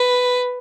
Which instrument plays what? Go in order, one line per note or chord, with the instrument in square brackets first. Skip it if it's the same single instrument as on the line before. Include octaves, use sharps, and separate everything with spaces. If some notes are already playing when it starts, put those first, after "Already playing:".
Already playing: [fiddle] B4